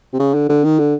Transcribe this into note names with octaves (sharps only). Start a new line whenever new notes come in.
C3
C#3
D3
D3
D#3
D3